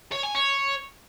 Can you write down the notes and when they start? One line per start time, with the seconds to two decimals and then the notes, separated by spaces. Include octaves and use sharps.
0.12 C#5
0.23 G#5
0.35 C#5